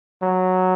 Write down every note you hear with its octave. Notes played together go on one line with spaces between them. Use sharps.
F#3